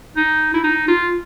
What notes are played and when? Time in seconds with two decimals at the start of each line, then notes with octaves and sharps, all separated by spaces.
0.16 D#4
0.54 E4
0.64 D#4
0.88 F4